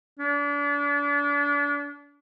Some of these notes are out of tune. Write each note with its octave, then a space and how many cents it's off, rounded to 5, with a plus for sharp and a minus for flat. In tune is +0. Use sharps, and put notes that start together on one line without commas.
D4 -35